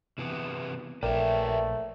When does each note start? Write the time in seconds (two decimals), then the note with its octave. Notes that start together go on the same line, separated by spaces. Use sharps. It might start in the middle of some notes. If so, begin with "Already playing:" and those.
0.18 C3 E3 B3
1.03 A#1 A3 A#4 B4 C#5 D5 E5 G5